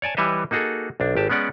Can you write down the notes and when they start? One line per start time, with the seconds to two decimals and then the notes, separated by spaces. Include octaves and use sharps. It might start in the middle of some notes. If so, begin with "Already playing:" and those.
0.02 C#5 D5 G#5 A5
0.17 E3 G3 B4 C#5 D#5 E5
0.51 A#3 D#4 F#4 G#4 A4
1.00 B1 D4
1.15 G#1 G4 A5
1.30 G#3 B3 C#4 D5 F#5